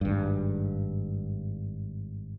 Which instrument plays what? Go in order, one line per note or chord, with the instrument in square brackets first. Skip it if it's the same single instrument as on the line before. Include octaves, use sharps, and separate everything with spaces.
[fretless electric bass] G#1 G2